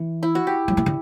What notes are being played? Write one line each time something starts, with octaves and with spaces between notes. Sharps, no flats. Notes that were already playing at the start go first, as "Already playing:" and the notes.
Already playing: E3
E4
F#4
G4
F#3
E3
D3